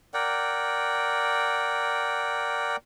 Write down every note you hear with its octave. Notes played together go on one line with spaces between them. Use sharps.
A#4 D5 F#5 G5